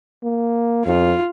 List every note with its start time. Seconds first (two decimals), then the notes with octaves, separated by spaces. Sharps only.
0.23 A#3
0.86 F2 F4